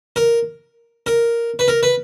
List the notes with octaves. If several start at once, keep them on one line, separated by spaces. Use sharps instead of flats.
A#4
A#4
B4
A#4
B4